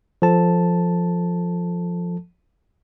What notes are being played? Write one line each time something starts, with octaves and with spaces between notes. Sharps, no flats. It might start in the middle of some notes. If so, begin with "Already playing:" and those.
F3 A4 A5